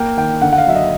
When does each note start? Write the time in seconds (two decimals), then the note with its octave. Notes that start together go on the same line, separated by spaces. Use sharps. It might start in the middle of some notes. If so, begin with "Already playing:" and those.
Already playing: A#3 G5
0.17 D#3 G5
0.42 D3 F#5
0.53 F#5
0.58 F5
0.66 F#3 E5
0.75 D#5